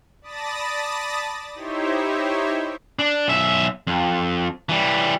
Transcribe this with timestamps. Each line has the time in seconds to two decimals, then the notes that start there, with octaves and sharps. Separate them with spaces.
0.22 D5 A5 B5 D#6 A6 A#6
1.54 D#4 E4 G4 C5 C#5 E5
2.99 D4
3.28 B1 E5
3.87 F2
4.69 E3 G3